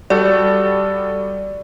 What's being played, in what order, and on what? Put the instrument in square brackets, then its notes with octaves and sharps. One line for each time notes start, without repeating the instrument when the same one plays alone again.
[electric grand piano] G3 F#4 A4 [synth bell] D5